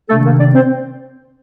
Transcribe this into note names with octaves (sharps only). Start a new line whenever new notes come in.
C3 D#3 A3 A#3 D4 A4
A#3 A#4
D4 D5
C4 C5